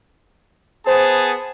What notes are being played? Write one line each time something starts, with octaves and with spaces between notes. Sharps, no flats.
B3 G#4 C5 A5